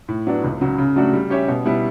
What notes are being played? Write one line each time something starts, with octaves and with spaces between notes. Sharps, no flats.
A2
F#3 B3 D4
C#2
C#3 F#3
C#3
F#3 A3 D4 F#4
G3
C#4 G4 C#5 E5
B2
G3 B3 E4 B4